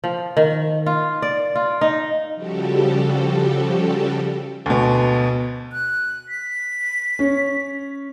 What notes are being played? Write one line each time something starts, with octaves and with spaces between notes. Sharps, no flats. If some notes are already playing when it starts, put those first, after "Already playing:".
F3
D#3
F4
D5
F4
D#4
C#3 F3 G3 F#4 G4 A4
D2 B2
F#6
B6
C#4